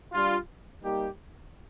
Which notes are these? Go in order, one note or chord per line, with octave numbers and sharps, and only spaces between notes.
G3 D4 F4
G3 A#3 D#4 G4